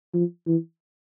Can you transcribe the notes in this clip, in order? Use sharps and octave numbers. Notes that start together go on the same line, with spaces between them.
F3
E3